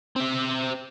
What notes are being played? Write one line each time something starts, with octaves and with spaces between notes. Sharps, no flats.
C4 E5